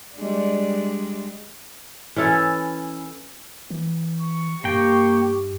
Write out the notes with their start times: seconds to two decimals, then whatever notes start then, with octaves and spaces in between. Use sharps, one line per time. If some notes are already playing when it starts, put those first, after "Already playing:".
0.16 G3 G#3 D4
2.16 E3 C#4 E4 A4
3.70 E3
4.21 C#6
4.64 G2 A#3 G4 G5